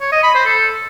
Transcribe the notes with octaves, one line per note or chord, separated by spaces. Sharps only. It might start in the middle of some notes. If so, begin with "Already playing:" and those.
C#5
D#5
B5
C5
A4